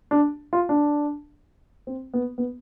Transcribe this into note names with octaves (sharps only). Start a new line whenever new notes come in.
D4
F4
D4
C4
B3
B3